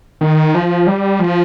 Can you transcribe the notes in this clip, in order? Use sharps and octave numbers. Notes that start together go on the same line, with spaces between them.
D#3
F3
G3
F3